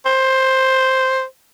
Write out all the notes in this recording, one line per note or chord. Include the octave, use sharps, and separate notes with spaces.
C5